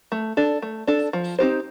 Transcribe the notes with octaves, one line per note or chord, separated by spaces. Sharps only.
A3
D4 A4
A3
D4 A4
F3
C4 D#4 G4 C5